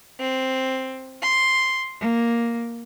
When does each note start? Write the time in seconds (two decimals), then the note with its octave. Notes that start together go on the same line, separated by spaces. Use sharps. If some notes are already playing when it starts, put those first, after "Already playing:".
0.20 C4
1.21 C6
2.01 A#3